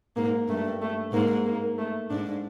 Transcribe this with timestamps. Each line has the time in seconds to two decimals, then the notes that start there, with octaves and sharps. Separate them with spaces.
0.17 G#2 A#3
0.49 G2 A3
0.81 A3
1.13 G#2 A#3
1.46 A#3
1.78 A3
2.10 G#2 D4